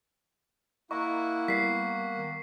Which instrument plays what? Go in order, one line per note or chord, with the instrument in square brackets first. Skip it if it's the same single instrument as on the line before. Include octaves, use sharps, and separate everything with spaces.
[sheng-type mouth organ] A#3 F#5 [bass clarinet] E4 [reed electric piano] D#5 A#5 [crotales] C#6
[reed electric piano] G3 B3 A#4 [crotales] B6 C7
[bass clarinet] D#3